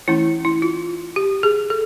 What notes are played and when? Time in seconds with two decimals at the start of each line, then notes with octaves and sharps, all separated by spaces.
0.08 E3 A3 C#4 E4
0.45 E4
0.62 F4
1.16 G4
1.43 G#4
1.70 A4